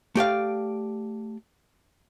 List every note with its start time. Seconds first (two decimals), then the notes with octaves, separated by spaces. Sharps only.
0.15 A3 G4 D5 F5